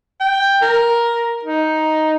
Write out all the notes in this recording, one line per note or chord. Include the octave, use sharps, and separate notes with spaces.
G5
A#4
D#4